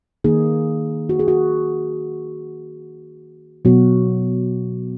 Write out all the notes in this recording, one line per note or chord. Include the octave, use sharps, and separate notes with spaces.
D#3 A#3 D#4 G#4
F#4
G#4
F#4
B2 F#3 B3 F#4